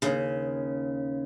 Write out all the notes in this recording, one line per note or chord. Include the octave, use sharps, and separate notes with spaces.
D#2 C#3